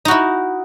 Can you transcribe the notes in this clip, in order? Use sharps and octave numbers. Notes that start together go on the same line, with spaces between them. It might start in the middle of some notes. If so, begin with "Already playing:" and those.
D#4 E4 F#4